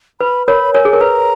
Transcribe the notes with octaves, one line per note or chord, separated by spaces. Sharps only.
B4 B5
A#4 C#5 B5
A#4 C#5 G#5
G#4
A#4
B4 A#5